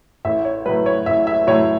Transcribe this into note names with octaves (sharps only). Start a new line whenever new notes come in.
A1 E5
C#5
A2 F#3 B4
C#5
A1 E5
E5
A2 F#3 C#5